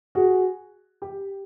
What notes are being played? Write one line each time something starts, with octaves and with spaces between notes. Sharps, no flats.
F#4 G#4
G4